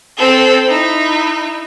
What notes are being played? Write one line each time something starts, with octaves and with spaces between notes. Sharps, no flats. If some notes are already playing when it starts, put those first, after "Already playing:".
C4 A4
D#4 E4